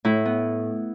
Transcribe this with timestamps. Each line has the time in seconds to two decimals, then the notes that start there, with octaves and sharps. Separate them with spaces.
0.05 A2 E4
0.25 B3